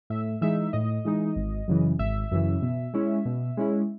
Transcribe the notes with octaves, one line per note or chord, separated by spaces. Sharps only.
A2 E5
E3 G#3 D#4 E5
A2 D#5
E3 G#3 D#4
G#1
F#2 C#3 E3
G#1 E5
F#2 C#3 E3
B2
G#3 C#4 E4
B2
G#3 C#4 E4